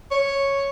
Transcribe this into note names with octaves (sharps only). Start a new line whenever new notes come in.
C#5